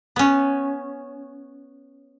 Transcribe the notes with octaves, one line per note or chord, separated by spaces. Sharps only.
B3 C#4